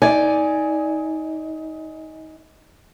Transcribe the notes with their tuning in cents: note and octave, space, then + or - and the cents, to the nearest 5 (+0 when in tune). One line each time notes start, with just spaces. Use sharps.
D#4 +25 D5 +0 G#5 +0